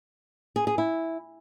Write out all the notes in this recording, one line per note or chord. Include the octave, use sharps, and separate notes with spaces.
G#4
G#4
E4